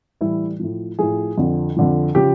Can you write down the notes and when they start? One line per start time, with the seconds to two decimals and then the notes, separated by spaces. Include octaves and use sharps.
0.21 A2 E3 G3 E4
0.59 A2 F3
0.99 A2 F3 G#4
1.38 F2 D3 F3
1.76 F2 D3 F3
2.15 C#3 F3 G4